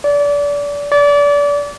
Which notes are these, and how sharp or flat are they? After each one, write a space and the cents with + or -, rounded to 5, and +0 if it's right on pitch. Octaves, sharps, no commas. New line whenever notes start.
D5 -30
D5 -30